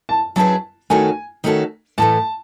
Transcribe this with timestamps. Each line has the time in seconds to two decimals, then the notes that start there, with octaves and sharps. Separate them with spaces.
0.09 A5
0.36 F#3 C#4 E4 G#4 B4 A5
0.90 D#3 A3 C#4 F#4 A4 G#5
1.44 D#3 A3 C#4 F#4 A4
1.98 A2 E3 A3 A5